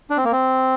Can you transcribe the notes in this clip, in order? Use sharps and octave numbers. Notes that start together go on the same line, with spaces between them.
D4
C4
A#3
C4